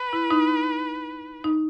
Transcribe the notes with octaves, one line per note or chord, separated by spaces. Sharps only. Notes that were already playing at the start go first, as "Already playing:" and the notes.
Already playing: B4
E4
D#4
D#4